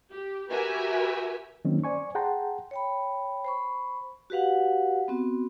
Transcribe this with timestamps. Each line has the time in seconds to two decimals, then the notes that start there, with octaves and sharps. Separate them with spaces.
0.12 G4
0.50 F#4 G4 A#4 B4 E5 G#5
1.65 D#3 F#3 A#3 C4 C#4 D#4
1.84 C5 D5 G#5 C#6
2.15 G#4 F#5 G5 A5 A#5 C6
2.71 C#5 G5 B5
3.45 C5 B5 C#6
4.30 F#4 G4 B4 F5 F#5
5.08 B3 C4 F#4